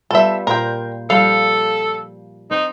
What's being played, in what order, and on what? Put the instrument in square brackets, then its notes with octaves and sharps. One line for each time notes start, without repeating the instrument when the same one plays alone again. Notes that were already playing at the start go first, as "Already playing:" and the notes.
[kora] G3 B3 F4 [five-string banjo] A4 E5
[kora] A#2 C5 [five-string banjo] A#4 G5
[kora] F3 G3 [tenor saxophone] A4 [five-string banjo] F5
[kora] C4 [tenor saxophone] D#4